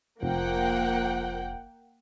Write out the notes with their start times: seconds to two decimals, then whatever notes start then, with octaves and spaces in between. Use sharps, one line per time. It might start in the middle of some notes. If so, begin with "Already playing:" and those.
0.23 F1 F3 A#3 F#5 G5